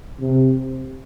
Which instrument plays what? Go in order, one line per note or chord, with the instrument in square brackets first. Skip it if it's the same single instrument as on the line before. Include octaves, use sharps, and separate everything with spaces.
[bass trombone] C3